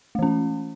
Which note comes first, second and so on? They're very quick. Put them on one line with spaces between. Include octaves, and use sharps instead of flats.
A3 E3 C#4